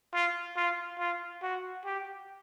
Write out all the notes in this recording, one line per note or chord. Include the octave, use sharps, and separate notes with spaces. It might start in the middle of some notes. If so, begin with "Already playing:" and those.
F4
F4
F4
F#4
G4